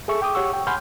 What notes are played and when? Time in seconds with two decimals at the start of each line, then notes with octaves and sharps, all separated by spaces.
0.08 G#4 A4 E5 C#6
0.22 G5 D6 D#6
0.35 G4 C#5 F#5 C#6 E6
0.53 G5
0.67 F#5 G#5 B5 C6 F6 G6